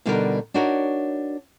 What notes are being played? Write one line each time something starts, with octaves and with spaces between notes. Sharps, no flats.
B2 D3 G3 D4 D#4 A#4
D4 D#4 F#4 A#4 C#5